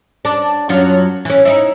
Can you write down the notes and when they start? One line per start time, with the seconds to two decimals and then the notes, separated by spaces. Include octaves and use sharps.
0.25 D4
0.69 F#2 F#3 F4
1.25 E3 C#4
1.45 D#4 E4